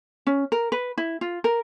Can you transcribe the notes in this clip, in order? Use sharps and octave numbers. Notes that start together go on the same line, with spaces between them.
C#4
A#4
B4
E4
F4
A#4